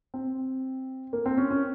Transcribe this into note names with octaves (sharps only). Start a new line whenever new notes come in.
C4
A#3
C4
C#4
C#4